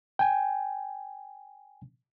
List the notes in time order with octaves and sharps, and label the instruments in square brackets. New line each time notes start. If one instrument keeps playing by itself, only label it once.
[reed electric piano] G5 G#5